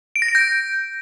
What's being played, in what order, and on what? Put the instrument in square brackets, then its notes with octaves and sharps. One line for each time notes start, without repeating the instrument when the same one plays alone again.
[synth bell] D7
A#6
D7
G6